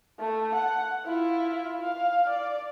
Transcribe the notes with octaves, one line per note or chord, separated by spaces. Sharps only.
A3
F#5
E4 F4
F5
D5